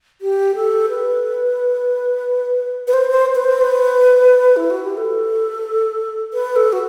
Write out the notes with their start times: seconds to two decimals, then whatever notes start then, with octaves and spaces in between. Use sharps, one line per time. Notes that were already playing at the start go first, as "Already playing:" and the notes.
0.21 G4
0.55 A4
0.89 B4
2.87 B4
2.93 C5
3.10 C5
3.35 B4
3.44 C5
3.61 B4
4.56 E4
4.70 F#4
4.83 G4
4.97 A4
6.33 B4
6.56 A4
6.73 F#4